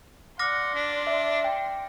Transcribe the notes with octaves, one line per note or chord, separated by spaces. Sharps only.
D5 F#5 C6 D6 F6 A#6
D4
E5
G5